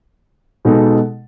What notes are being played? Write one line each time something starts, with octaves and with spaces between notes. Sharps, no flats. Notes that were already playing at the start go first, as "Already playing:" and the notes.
B2 G#3 D#4 A4